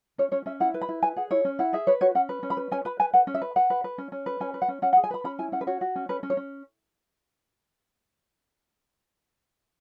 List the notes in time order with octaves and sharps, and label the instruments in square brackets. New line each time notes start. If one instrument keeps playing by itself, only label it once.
[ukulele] C#4 C#5
C#4 C#5
C#4 E5
E4 F#5
B4
B5
E4
B4 G#5
G#4 F#5
E4 C#5
C#4
E4 F#5
G#4 E5
B4 C#5
F#4 C#5
C#4 F#5
B4
C#4
B5
B4
C#4 G#5
B4 B5
B4 G#5
B4 F#5
C#4
E5
B4
B4 F#5
B4
B4
C#4
C#4
B4
C#4 G#5
B4
F#5
C#4
C#4 F#5
F#5
G#4
G#5
B4 B5
C#4 B5
E4 G#5
C#4 F#5
B4
F#4 C#5
F#4
C#4
C#4 B4
C#4
C#5
C#4